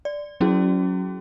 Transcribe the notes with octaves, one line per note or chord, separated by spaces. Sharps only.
D5
F#3 C#4 E4 F#4 G#4